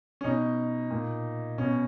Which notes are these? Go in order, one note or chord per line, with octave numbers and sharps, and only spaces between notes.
C#4
B2 D#4
A#2
B2 C#4